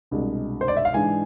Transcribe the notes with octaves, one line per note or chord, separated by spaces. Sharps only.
C2 B2 G#3 D4
C5
D5
E5
F5
G#2 E3 G#3 D4 G#5